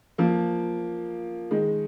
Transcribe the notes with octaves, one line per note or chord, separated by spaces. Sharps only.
F3 A#3
D#3 G#3